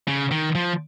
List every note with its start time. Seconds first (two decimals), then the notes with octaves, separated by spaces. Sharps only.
0.08 C#3
0.31 D#3
0.55 F3